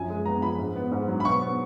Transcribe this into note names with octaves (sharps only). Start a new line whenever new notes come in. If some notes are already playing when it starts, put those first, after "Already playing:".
Already playing: F#2 F3 G#5
G#3
B3 A#5
F3 B5
G#2
B3
G#2
F#3
B5
B2 C#6
B3